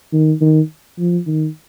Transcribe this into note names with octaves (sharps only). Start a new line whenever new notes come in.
D#3
D#3
F3
D#3